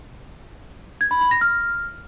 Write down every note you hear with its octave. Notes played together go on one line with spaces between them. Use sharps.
G#6
B5
B5
A#6
F6